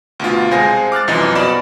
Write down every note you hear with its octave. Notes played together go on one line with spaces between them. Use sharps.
D2 B2 F4
C2 G#3 C5 F5 G#5 A#6
D6 F6 F#6 A6
C2 F#2 E3 F3 D#5
B2 D5 B5 E7